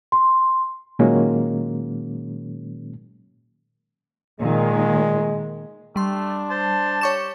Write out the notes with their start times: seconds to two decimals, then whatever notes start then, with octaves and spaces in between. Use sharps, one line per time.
0.12 C6
0.99 A#2 D#3 F#3 G#3 A#3 C#4
4.40 A#2 D#3 G#3
5.96 G3 A3 D4 C6
6.50 C5 A5
7.01 G4 C#5 C#6 E7